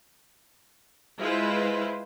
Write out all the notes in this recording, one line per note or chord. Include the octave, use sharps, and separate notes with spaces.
G#3 E4 F4 B4 C5